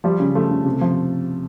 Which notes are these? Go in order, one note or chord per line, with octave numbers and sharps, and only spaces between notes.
F3 G3
C#3
F3 A3
C#3
C3
F3